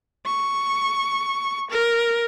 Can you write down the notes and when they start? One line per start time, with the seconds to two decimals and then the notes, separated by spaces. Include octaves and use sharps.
0.26 C#6
1.70 A#4